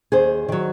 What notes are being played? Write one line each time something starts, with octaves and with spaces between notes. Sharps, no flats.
D#2 G#4 C5
D#3 F#3